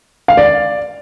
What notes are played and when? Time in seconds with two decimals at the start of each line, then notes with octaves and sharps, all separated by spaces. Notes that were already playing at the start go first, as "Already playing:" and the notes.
0.28 F5
0.37 D5